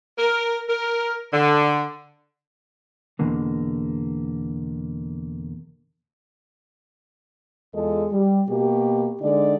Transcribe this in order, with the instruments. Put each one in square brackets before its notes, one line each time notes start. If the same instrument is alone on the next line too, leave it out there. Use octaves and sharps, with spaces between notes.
[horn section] A#4
A#4
D3
[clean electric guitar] E2 B2 D3 A#3
[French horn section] E2 G#3 F4 A4 D#5
G3
B2 A#3 F#4 G4
D3 G#3 D#4 D5